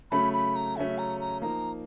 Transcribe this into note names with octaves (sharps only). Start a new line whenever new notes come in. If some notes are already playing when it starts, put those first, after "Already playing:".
C#3 F#3 A3 C#4 B5
B5
A#5
C#3 F#3 A3 C#4 E5
A#5
A#5
F3 A#3 D#4 A#5